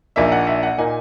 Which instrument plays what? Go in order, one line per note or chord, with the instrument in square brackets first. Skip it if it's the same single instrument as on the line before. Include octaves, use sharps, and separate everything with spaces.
[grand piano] A#1 A#2 A#3 D#4 E5
F#5
E5
F#5
A#2 A#3 D#4 G#5